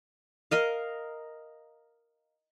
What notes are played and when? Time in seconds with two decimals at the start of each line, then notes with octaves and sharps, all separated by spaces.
0.51 A#4 D#5 F5